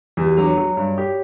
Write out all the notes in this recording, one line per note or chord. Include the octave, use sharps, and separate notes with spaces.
E2 G4
F#4
F#3 D4
C#5
F#3
G2
G4